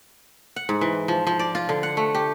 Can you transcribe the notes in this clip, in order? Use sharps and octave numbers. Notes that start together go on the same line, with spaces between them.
F#5
G#2
E3
F3
F3
D5
F4
D3
F#5
A3
G4